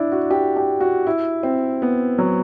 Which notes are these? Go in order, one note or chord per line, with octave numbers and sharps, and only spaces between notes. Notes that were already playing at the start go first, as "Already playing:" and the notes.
Already playing: D4 E4
F#4
G4
G4
F#4
E4
C4
B3
F#3